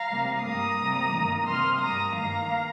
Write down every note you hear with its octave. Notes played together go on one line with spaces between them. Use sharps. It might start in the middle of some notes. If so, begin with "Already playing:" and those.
Already playing: F5 A#5
C3 G3 A#3
G2 G3 A#3 A#5 D#6
C3 G3 A#3
G2 D#3 A#3
C3 G3 A#3 C6 F6
G2 G3 A#3 A#5 D#6
G2 D#3 A#3 F5 A#5